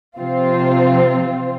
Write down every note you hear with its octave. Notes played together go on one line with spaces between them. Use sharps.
C3 F3 C4 F4